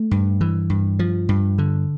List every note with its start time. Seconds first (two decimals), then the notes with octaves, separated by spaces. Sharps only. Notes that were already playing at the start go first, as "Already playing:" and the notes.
Already playing: A3
0.11 G2
0.41 E3
0.70 G2
0.99 F3
1.29 G2
1.58 D3